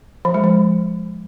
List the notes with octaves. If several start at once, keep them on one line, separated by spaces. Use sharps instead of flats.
F3
G#3
F3